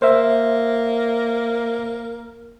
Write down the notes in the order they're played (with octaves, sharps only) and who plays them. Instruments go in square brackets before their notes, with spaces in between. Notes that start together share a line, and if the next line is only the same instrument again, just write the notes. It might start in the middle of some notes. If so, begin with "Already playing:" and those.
[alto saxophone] A#3 [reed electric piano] C5 E5